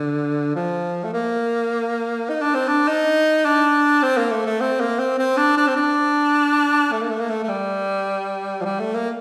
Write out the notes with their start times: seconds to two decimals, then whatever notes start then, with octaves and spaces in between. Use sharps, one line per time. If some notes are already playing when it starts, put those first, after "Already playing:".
Already playing: D3
0.56 F3
1.04 A3
1.13 A#3
2.29 D#4
2.42 D4
2.54 C4
2.68 D4
2.88 D#4
3.45 D4
4.03 C4
4.17 A#3
4.31 A3
4.46 A3
4.61 C4
4.80 A#3
4.99 C4
5.19 C4
5.37 D4
5.57 D4
5.67 C4
5.76 D4
6.92 A3
7.02 A#3
7.10 A3
7.20 A#3
7.30 A3
7.43 A3
7.49 G3
8.61 F3
8.65 G3
8.80 A3
8.94 A#3